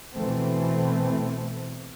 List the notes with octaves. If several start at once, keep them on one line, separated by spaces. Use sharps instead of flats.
B2 E3 A3 C4